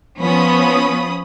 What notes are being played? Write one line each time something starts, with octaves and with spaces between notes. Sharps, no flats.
F3 B3 C#4 B5 D#6